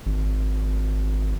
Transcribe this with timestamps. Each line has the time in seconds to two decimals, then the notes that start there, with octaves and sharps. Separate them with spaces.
0.06 G#1